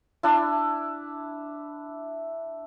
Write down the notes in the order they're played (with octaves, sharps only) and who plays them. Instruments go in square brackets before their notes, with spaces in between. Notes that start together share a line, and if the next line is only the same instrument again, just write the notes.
[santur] D4 E4